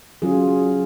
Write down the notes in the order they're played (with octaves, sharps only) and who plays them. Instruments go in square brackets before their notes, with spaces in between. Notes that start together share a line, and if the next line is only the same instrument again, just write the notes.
[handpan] F#3 C#4 F4 G#4